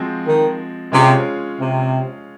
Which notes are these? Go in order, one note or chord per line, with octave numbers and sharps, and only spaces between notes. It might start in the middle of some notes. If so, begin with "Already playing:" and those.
Already playing: F3 G#3 C4 F#4
D#3
C3 G#3 C#4 F4 G#4
C3